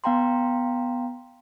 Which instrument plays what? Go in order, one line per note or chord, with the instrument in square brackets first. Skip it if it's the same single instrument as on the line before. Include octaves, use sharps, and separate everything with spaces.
[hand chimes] B3 F5 G5 A#5 C6